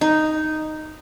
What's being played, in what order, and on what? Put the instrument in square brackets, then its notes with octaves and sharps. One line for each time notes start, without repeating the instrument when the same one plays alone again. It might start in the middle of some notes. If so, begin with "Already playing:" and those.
[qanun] D#4